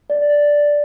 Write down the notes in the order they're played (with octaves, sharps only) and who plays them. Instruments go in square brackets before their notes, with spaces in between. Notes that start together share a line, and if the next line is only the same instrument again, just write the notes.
[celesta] D5